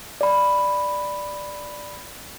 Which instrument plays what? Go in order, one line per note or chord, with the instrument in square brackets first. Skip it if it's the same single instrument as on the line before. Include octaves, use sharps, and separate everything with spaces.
[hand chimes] D5 B5